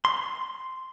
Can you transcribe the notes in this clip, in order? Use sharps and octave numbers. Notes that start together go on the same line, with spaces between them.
C6